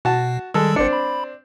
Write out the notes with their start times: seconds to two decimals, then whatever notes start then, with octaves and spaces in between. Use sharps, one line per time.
0.05 B2 F#4 A5
0.54 D#3 G3 G#3 A4 E6
0.76 G1 C4 D4 C#7
0.93 B5